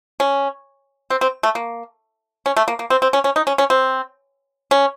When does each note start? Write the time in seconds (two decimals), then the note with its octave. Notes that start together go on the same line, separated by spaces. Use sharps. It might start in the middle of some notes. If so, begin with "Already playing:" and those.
0.20 C#4
1.10 C4
1.21 C4
1.43 A3
1.55 A#3
2.46 C#4
2.57 A3
2.68 A#3
2.79 A#3
2.90 C4
3.02 C4
3.13 C#4
3.24 C#4
3.36 D#4
3.47 C#4
3.58 C#4
3.70 C4
4.71 C#4